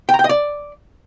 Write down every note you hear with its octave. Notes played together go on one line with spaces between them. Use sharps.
G5
A#5
G5
D#5
D5